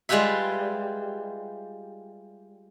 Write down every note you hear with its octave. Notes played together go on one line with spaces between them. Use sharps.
G3 G#3 F4 G4 B4 E5